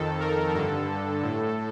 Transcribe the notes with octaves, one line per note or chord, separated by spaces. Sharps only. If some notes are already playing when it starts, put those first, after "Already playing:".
Already playing: F2 D#3 A4
A#4
G2 D3 A4
A2